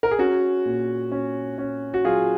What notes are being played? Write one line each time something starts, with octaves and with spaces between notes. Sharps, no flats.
A#4
G#4
C#4 F#4
A#2
C#4
C#4
F#4
F#3 F4 G#4